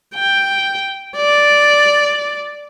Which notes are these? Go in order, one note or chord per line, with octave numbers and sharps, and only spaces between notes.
G5
D5